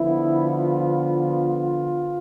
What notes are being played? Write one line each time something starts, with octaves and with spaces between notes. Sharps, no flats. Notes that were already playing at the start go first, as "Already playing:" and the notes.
Already playing: D3 F3 B3 E4
F4